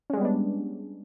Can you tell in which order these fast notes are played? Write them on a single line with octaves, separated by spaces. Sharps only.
C#4 G#3 G3 B3 D4